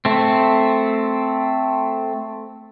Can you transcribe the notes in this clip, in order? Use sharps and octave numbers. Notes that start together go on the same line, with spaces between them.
A3 C4